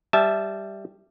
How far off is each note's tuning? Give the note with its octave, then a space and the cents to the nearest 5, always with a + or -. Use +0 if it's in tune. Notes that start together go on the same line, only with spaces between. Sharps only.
G3 +0 E5 +0 A5 -15